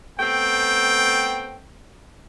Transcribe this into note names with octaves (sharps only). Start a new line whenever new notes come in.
A3 B3 C4 G5